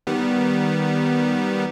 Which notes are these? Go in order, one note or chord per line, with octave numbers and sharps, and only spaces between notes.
D#3 G3 B3